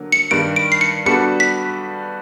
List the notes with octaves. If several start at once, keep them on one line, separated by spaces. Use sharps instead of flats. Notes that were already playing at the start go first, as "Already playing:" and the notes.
Already playing: D3 F#3 A#3
C#7
G2 D#3 G3 D7
D7
C7
C#7
G3 B3 D4 F#4 A4 C#7
B6